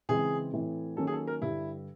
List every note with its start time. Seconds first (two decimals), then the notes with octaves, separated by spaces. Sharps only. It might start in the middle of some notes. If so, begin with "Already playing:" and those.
0.09 C#3 E3 G#3 C4 G#4
0.53 A2 E3 A3 C4
0.97 D#3 F#3 A#3 C#4 A4
1.07 G#4
1.12 A4
1.27 A#4
1.41 G2 D3 G3 E4